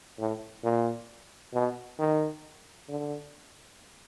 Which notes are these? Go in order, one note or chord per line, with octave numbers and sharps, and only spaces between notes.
A2
A#2
B2
D#3
D3